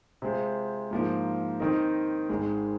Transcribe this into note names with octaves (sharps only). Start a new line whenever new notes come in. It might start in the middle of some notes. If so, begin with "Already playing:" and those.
C3 G#3 F4 C5
G#2 F3 A#3
D#3 C4 D#4 A#4
G#1 G#2 G#3